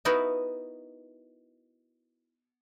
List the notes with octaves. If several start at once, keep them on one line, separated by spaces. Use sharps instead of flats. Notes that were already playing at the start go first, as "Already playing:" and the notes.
B3 D#4 E4 F#4 A#4 B4